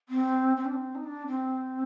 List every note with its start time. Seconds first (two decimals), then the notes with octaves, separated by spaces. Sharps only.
0.09 C4
0.56 C4
0.65 D4
0.73 C4
0.95 D#4
1.04 D4
1.27 C4